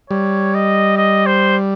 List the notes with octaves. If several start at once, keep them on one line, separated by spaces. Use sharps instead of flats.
G3 C#5
D#5
D#5
C5